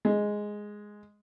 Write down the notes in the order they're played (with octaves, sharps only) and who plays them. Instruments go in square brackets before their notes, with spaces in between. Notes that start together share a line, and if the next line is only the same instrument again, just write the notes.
[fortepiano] G#3